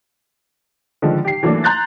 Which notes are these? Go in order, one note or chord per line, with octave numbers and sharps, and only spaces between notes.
D3 D#3 F3 G#3
G4 C7
E3 F#3 A3 A#3 D4
A#5 C6 F#6 G6 A6